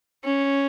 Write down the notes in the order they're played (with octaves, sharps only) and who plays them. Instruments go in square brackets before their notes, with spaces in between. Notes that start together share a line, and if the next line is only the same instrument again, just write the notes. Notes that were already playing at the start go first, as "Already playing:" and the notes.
[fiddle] C#4